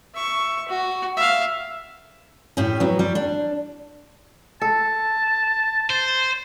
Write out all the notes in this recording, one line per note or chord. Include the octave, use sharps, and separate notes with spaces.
E5 C#6
F#4
E5 F5
A2 C#4 G4 G#4
F#3 B3
G3
D4
A4 A5
C5